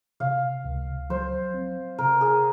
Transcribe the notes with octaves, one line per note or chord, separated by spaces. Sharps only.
C3 F5
C#2
F#3 C5
C4
C3 A#4
G#4